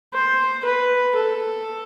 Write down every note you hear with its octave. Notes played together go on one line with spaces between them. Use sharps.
C5
B4
A4